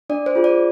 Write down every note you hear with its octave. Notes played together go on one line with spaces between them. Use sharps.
D4 D5
C5
F4 G#4
D5